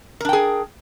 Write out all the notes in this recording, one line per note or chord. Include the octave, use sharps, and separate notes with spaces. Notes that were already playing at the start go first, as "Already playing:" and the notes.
D4 G#4 A#4 G5